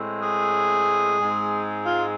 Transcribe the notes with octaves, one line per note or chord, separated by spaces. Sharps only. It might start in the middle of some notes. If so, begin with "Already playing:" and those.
Already playing: A2 G#3 C4
G#4
G#2 G#3 C4
F4